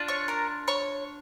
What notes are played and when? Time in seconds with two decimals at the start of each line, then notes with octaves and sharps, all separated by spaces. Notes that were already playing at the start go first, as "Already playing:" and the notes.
Already playing: D4 F4
0.08 C#5 C#6
0.28 A#4 A#5
0.68 C#5 C#6